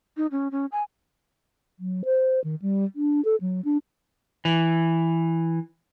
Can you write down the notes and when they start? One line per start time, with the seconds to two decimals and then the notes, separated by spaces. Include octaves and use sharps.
0.17 D#4
0.31 C#4
0.51 C#4
0.72 G#5
1.79 F#3
2.05 C5
2.44 D#3
2.62 G3
2.96 D4
3.25 A4
3.41 F#3
3.65 D4
4.45 E3